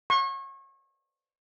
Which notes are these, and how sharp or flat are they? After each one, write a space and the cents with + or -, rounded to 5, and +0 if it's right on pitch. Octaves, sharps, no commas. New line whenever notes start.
C#6 -30